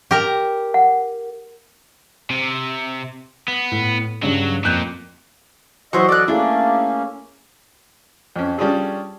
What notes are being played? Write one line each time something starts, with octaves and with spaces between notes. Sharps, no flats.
G4 A#4 A#5
F#5
C3
B3
A2
G2 C#3 F#3
F2 A#2 F#6 G6
E3 F#3 C5 D#5 E5 F#5 C#6
A4 D5 D#5 F#6
A3 A#3 C#4 D4 E4 G#4
F2 C#4
G3 C#4 D4 F4 G#4 A4